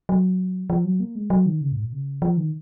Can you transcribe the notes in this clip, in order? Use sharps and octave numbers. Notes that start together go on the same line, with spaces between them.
F#3
F3
F#3
A#3
G#3
F#3
D#3
C#3
G#2
A#2
C#3
F3
D#3